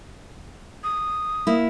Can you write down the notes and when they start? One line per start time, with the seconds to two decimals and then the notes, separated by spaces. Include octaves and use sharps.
0.84 D#6
1.47 A#3 E4